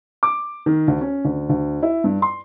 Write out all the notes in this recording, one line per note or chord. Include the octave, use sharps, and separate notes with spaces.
D6
D#3
D2
C#4
D2
D2
E4
G2
C6